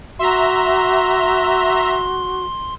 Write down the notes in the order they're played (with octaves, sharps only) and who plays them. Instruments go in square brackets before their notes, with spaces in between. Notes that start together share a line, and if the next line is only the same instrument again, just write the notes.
[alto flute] F#4 [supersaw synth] E5 A#5 [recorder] C6